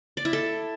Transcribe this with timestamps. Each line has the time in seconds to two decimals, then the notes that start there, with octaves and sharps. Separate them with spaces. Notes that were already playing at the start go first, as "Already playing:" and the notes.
0.17 D5
0.25 E4
0.33 A4